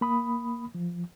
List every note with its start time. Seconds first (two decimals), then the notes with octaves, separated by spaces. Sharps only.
0.01 A#3 B5 D#6
0.75 F3